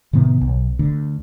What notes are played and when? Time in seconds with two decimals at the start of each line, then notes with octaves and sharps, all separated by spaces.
0.13 A2 C3 D#3 B3
0.41 B1
0.79 D2 D3